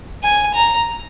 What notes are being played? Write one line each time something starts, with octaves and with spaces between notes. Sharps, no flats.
G#5
A#5